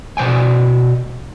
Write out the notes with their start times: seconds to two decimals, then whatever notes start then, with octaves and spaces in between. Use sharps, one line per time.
0.17 B2 C5 G5 G#5